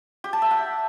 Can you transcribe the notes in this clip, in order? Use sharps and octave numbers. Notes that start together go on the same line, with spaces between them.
G4
A5
E5
F#5